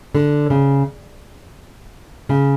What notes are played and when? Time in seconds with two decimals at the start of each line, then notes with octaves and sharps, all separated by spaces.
0.15 D3
0.50 C#3
2.29 C#3